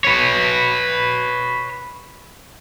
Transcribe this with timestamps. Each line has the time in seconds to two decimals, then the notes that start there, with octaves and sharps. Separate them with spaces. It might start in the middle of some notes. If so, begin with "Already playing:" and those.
0.05 B4 C#5